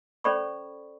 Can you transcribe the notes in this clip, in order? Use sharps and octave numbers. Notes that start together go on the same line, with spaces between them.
C#4 A4 C5 D5 B5 C#6